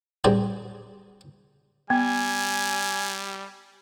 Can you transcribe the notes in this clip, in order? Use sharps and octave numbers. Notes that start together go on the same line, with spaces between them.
G2 C4 D4 G#4 C5 A#5
G3 B3 G#5